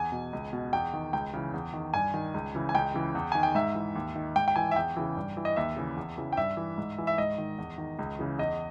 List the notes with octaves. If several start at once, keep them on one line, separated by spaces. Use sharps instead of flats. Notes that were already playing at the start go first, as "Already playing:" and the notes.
Already playing: E2 G#5
B2
C#2
B2
E2 G5
D#3
C#2 G5
C#3 E3
E2
D#3
G2 G#5
D#3
C#2
C#3 E3
G#5
C#2 G5
C#3 E3
E2
D#3 G#5
G5
G#2 E5
E3
D#2
D#3
G#2 G5
G5
E3 G#5
E5
E2 G5
C#3 E3
G2
E3
D#5
D#2 E5
C#3 E3
E2
C#3 E3
G5
G2 E5
E3
G#2
E3
E5
G#2 D#5
D#3
E2
D#3
C#2
C#3 E3
E2 D#5